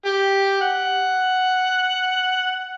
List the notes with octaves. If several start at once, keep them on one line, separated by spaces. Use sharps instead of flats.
G4
F#5